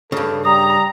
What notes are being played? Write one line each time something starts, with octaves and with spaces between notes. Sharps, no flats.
G2 C#3 A4
G3 A#5 D#6